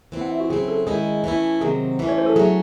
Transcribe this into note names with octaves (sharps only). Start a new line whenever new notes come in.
E3 C4 E4
F#5
E5
F#4
C#3 F#3 C4 E4 G#4
A4
D#3 G#3 C#4 E4 G#4
E3 A3 C#4 E4
C3 D#3 F#3 C4 G#4
E3 A3 C#4
C#5
C5
A4
F#3 A3 C#4 G#4